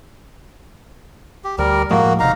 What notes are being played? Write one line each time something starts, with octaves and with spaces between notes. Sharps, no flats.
G4
D2 G3 A#4
A2 F3 G#3 A#3 F#4
D#1 C3 D#4 F5 A#5